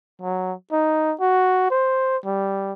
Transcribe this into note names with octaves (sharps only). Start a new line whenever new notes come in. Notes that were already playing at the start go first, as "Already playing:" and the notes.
F#3
D#4
F#4
C5
G3